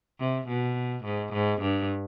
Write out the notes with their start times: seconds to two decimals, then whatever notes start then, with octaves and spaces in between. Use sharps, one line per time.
0.19 C3
0.48 B2
1.04 G#2
1.33 G#2
1.61 G2